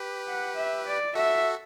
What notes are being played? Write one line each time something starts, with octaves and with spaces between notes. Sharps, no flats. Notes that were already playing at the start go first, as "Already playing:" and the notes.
Already playing: G4 B4
F#5
E5
D5
F#4 A4 E5